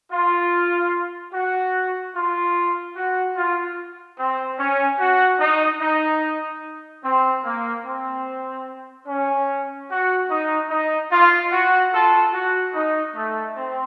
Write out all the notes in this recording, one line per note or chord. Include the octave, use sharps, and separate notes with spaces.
F4
F#4
F4
F#4
F4
C4
C#4
F#4
D#4
D#4
C4
A#3
C4
C#4
F#4
D#4
D#4
F4
F#4
F4 A4
F#4
D#4
A3
C4